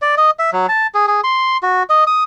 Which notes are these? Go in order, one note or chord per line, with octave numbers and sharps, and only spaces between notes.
D5
D#5
E5
F#3
A5
G#4
G#4
C6
F#4
D#5
D#6